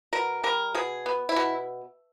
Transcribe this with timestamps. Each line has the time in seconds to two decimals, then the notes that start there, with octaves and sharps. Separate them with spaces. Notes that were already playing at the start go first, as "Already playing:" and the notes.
0.13 B2 A#4
0.44 G3 A#4
0.74 B2 G#4
1.06 B3
1.29 E4
1.36 B2